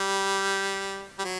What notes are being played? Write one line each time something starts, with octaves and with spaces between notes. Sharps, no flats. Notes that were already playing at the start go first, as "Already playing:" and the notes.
Already playing: G3
G3
F#3